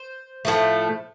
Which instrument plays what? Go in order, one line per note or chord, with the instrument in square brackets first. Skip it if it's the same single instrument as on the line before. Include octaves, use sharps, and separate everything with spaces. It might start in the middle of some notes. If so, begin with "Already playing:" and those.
Already playing: [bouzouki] C5
A2 F3 A3